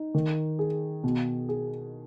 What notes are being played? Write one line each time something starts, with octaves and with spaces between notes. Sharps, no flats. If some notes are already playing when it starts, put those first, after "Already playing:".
Already playing: D#4
D#3
G#4
B2
G#4